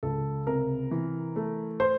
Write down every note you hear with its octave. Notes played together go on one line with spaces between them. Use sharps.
C#2 A4
C3 A#4
E3
A3
C5